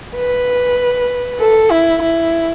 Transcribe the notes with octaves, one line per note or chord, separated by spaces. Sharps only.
B4
A4
E4
E4